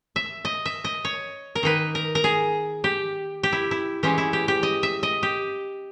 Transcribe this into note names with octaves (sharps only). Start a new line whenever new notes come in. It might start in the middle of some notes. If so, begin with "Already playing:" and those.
E5
D#5
E5
D#5
C#5
A#4
D#3 A#3 D#4 B4
A#4
A#4
G#4
G4
G4
E4
E4
E3 G#3 C#4 G4
E4
G4
G4
D#5
E5
D#5
G4